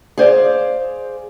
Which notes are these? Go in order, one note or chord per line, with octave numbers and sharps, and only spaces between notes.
G#4 C5 D5 F5